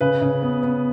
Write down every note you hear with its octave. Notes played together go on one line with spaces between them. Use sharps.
C#3 B4
C#3
B3
B3